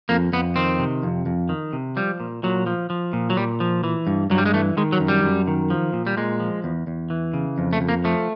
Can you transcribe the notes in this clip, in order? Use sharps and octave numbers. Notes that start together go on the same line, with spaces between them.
F2 A#3
F2 B3
D#3 C4
C3
F2
F2
D#3
C3
F3 G3
A#2
A#2 F#3
F3
F3
A#2
F#3
A#2 G3
F3
E3
G2
G2 F#3
G3
G#3
E3 A3
D#3 G#3
F#3
F#2
G3
F#2
D#3
F3
A#2
G3
A#2 G#3
F3
E2
E2
E3
C#3
F2
A3
F2
A#3
F3 A3